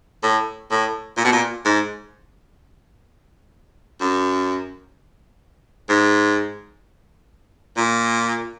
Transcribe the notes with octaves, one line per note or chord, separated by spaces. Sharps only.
A2
A2
A#2
B2
A#2
G#2
F#2
G#2
A#2